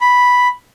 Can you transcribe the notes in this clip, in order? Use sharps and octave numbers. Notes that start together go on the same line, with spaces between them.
B5